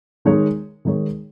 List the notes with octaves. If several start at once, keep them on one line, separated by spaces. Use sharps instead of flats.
D#3 G#3 D#4 G#4 C#5
D#3 G#3 D#4 G#4 C#5